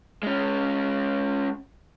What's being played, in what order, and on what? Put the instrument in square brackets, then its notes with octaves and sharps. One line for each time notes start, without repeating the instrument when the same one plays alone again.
[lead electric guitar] G#3 C#4